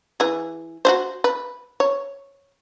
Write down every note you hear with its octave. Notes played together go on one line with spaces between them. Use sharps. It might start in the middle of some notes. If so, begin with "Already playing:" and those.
E3 G#4
F#4 G#4 C5
B4
C#5